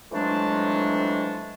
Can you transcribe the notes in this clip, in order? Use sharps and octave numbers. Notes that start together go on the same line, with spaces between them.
F2 E3 F#3 G#3 A3 D4